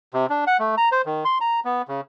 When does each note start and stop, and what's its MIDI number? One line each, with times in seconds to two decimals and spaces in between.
0.14 0.26 48
0.30 0.45 62
0.47 0.57 78
0.59 0.75 57
0.78 0.89 82
0.92 1.02 72
1.05 1.24 51
1.25 1.38 84
1.41 1.60 82
1.65 1.82 59
1.88 2.01 49